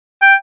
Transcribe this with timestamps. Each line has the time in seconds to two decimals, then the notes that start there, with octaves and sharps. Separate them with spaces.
0.22 G5